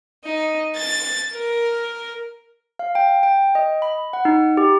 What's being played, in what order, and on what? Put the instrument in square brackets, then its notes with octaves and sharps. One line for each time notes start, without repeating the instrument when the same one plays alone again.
[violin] D#4
A6
A#4
[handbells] F5
G5
G5
D#5
B5
F#5
D#4
G4